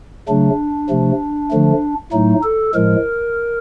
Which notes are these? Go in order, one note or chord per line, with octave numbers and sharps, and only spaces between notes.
C#3 F#3 A3 D4
C3 F3 A3
D3 F3 A3
A2 F#3 A3 D#4
A4
A2 F3 G#3 A#4